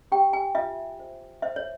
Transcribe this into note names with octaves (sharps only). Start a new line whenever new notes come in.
G4 G5
G#5
F4 E5
C5
C5 E5
C#5